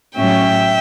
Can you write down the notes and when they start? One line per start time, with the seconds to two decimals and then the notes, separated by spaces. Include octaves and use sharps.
0.16 A2 F#3 C#4 E5 G5